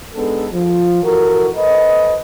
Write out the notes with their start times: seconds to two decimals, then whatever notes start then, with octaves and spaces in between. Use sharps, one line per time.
0.14 G#3 B3 D4 D#4 A4
0.52 F3
1.02 E3 F#4 A4 A#4
1.55 A4 B4 C5 D#5